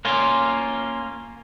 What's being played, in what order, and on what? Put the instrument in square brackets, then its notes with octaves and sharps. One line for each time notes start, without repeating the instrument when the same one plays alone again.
[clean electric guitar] A#3 C#4 F4